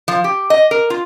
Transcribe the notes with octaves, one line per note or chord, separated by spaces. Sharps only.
F3
G4
D#5
A#4
F4